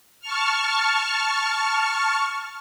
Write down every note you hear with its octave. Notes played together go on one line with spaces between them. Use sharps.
A5 C#6 F6